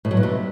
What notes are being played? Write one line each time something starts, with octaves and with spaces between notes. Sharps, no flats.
A2
F#3
G2
C3